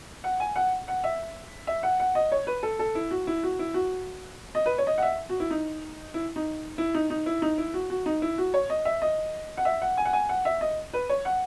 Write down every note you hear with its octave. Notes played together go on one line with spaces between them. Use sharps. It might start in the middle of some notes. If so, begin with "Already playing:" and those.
F#5
G#5
F#5
F#5
E5
E5
F#5
F#5
D#5
C#5
B4
A4
A4
E4
F#4
E4
F#4
E4
F#4
D#5
B4
C#5
D#5
F#5
E5
F#4
E4
D#4
E4
D#4
E4
D#4
D#4
E4
D#4
E4
F#4
F#4
D#4
E4
F#4
C#5
D#5
E5
D#5
F#5
E5
F#5
G#5
F#5
G#5
F#5
E5
D#5
B4
C#5
F#5